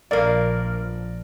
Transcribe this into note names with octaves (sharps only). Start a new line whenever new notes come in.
A#1 G2 F3 A#3 A#4 D5